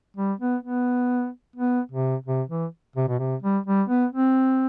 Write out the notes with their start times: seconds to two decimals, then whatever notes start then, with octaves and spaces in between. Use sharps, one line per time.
0.16 G3
0.40 B3
0.63 B3
1.56 B3
1.91 C3
2.26 C3
2.49 E3
2.96 C3
3.08 B2
3.19 C3
3.42 G3
3.66 G3
3.89 B3
4.12 C4